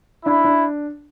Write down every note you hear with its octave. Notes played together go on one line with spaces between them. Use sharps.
D4 E4
D4